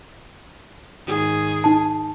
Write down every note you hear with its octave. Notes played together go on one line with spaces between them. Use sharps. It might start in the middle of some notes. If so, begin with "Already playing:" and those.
G#2 D#3 G#4
D#4 A5